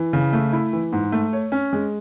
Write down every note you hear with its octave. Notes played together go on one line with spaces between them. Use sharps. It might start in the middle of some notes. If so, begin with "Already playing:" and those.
Already playing: E3
C#3
A3
E4
E3
G#2
A3
C#5
C#4
G#3